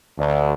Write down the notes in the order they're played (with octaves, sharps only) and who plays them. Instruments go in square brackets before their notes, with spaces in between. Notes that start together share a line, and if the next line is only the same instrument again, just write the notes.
[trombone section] D2